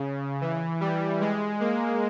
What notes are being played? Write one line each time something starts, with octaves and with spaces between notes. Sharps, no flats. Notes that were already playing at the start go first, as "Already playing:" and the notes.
Already playing: C#3
E3
G3
G#3
A#3